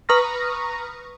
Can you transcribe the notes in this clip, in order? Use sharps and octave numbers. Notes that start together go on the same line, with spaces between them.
B4 A#5 C#6 D#6 F6 A#6